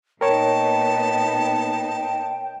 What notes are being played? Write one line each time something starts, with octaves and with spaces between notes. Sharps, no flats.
A#2 B3 D#4 A#4 C#5 G5 A5